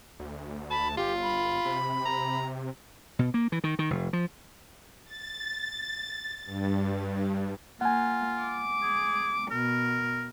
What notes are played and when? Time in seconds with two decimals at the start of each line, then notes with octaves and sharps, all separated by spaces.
0.19 D2
0.71 A5 B5
0.97 G1 F4 G4
1.22 B5
1.65 C3
2.05 A#5
3.19 B2
3.34 A#3
3.52 E3
3.64 D#3
3.79 D#3
3.90 F1
4.13 F3
5.05 A6
6.45 G2
7.81 A#3 F4 F#5 G#5
8.41 D6
8.82 G#4
9.51 B2 A#4